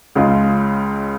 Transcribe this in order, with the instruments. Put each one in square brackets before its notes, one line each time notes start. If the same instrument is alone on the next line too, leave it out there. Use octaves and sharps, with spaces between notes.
[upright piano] C#2 C#3 G#3 F4